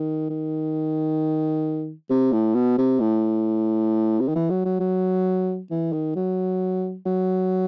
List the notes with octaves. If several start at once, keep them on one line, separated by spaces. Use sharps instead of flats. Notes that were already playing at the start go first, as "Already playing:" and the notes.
Already playing: D#3
D#3
C3
A2
B2
C3
A2
C3
D#3
E3
F#3
F#3
F#3
E3
D#3
F#3
F#3